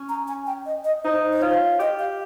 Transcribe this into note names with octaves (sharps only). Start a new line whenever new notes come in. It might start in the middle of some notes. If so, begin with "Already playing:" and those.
Already playing: C#4
A#5
G#5
G5
D#5
D#5
D#4 C5
C5
F4 C#5
G4 D#5
F5